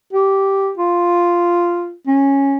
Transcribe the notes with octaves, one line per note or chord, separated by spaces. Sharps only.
G4
F4
C#4